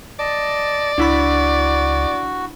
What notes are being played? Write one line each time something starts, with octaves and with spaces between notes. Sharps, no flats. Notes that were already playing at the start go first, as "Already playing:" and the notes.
D5 D#5 A5
C#2 D4 E4 F#4 B5